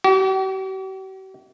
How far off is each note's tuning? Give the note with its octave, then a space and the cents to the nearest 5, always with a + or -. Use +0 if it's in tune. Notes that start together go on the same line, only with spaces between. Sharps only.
G4 -45